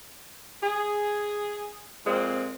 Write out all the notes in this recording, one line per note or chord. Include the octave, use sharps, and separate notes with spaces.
G#4
F2 A#2 G#3 C4